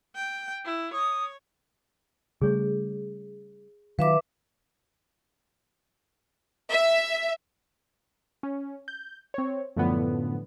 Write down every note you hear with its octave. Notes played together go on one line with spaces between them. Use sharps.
G5
E4
C#5 D#6
C#3 G3 A3 G#4 C#5
D#3 F#3 F4 B4 E5 F5 D6
E5
C#4
G6
C4 C#5
F#2 A2 D3 F3 B3